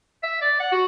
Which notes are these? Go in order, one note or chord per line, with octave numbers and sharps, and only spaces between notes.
E5
D5
F#5
F#4